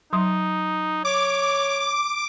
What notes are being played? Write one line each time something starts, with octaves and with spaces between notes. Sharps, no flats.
F#3 D#4 C6 D#6
C#5 D6